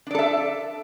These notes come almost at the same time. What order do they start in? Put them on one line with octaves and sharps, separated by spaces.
D4 D5 A4 E5